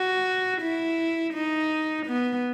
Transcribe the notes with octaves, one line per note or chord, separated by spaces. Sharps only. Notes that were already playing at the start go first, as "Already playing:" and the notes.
Already playing: F#4
E4
D#4
B3